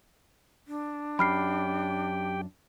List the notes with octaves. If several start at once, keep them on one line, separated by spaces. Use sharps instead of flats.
D4
F#2 G4 G5 B5 F6 C7